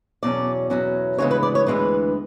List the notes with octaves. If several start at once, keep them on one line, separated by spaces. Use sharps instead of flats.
E2 B2 F#3 C#4 D5
E2 B2 F#3 C#4
D2 C#3 E3 G#3 B3 C#5
B4
D5
C#5
D2 C#3 E3 G#3 B3 B4